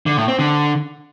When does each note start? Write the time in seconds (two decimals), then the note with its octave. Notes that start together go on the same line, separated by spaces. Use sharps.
0.06 D3
0.17 A2
0.28 C4
0.39 D3